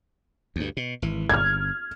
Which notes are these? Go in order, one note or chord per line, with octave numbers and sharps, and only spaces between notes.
D2 G2
B2
G#1 E3
G1 F6 G#6